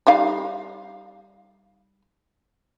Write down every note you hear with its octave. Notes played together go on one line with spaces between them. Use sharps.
G3 D#4 F5